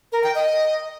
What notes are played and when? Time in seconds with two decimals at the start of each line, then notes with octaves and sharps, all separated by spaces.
0.12 A#4
0.24 G5
0.35 D#5